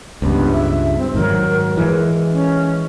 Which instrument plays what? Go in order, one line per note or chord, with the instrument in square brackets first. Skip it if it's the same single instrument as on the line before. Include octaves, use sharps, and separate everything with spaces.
[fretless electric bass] C#2 G2 [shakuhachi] B3
[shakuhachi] E5
C4
[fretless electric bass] G#2 D#3 F#3 [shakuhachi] A#4
[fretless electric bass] E3 G#3
[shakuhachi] C#4